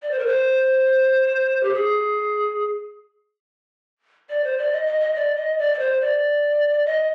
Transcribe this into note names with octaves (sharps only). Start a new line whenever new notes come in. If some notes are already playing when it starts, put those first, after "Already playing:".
D5
C5
A#4
C5
G4
G#4
D5
C5
D5
D#5
D#5
D#5
D5
D#5
D5
D5
C5
D5
D#5